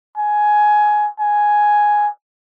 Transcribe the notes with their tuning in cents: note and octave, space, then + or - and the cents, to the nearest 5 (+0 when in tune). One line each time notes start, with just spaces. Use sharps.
G#5 +15
G#5 +5